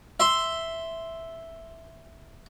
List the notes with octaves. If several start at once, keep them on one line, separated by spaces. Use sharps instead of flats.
E5 C6